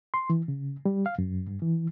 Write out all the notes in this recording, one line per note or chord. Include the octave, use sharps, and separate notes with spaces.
C6
E3
C#3
G3
F5
F#2
G2
E3